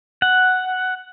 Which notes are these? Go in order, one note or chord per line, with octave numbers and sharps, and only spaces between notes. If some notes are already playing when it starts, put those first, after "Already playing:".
F#5